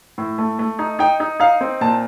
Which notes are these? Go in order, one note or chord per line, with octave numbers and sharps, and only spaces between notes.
A2
A3
A3
D#4
D#4 G5
D#4
D#4 F5
C4
A#2 A5